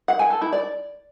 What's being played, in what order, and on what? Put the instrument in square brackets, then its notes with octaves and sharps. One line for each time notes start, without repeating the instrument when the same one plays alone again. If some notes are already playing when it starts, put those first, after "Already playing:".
[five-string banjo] F#5
G#5
A4
E4
D5